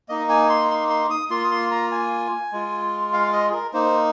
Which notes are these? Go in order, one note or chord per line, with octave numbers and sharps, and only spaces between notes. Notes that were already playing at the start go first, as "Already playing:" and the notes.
A#3 D#4 D#5
G#5
C6
C6
C6
D#6
A#3 F4 C6
D#6
C6
A#5
G#5
G#3 F4
F5
D#5
G#4
A#4
A#3 D#4 C5